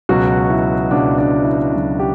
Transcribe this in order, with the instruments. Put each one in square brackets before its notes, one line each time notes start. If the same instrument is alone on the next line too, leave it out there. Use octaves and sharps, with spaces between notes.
[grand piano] C#2 B2 F#3 F#4
E4
C#2 B2 F#3 D4
D4
E4
C#2 B2 F#3
G4